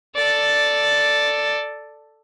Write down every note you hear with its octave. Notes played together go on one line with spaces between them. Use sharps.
A4 D5